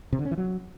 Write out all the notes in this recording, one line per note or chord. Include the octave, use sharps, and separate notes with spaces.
C3
D3
C#4
E3
F#3